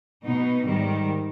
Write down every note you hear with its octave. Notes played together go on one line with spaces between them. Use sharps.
B2 B3 D#4
G#2 D#3 G3